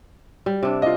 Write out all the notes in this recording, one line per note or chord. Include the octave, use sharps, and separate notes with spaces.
G3
C3 D4
F4 D#5